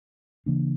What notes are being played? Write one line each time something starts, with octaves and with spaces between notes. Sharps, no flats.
C#3 E3 A#3 D4